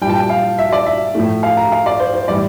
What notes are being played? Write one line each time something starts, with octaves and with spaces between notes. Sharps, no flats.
A#2 G3 G5 A5
G5
F5
E5
D5
E5
A2 F3 A3
F5
A#5
F5
D5
C5
C5
A2 E3 G3 D5